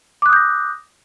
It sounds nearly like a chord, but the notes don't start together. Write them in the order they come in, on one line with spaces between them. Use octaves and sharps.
D6 F#6 D#6 G6 A#6